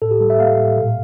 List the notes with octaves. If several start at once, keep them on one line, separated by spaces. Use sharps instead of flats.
A2 A4
G4
G3 A4
E5
A#3 F5
A2
A#2